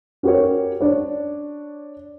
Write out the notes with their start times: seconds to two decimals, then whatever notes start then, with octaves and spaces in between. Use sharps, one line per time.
0.23 C#4 F#4 G4 A#4 C#5
0.81 D4 C#5 D5